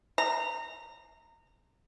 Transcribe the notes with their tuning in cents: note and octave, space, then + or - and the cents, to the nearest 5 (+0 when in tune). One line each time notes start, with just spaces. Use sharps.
A#5 -25